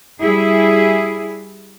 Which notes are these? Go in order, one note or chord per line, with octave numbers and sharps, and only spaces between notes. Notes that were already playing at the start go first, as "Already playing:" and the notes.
G3 E4 G#4